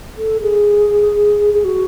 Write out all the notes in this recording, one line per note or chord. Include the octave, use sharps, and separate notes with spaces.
A4
G#4
G#4
F#4